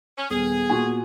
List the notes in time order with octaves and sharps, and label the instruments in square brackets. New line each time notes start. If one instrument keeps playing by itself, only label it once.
[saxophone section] C#4
[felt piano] D#1 [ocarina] B3 [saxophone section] G#4
[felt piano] A#2 F#4 G#5